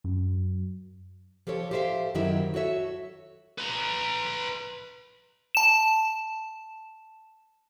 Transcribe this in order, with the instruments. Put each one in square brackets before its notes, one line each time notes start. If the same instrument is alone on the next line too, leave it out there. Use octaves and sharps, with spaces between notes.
[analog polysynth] F#2
[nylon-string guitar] F3 G4 A4 C#5
G4 A4 C5 C#5 E5 F5
F#2 D#3 F#3 E4 E5
F#4 A4 C#5 E5
[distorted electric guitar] B4 A#5
[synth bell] A5 E7